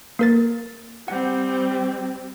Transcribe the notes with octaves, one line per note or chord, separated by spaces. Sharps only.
A#3 A#4 A6
G3 C4 F#5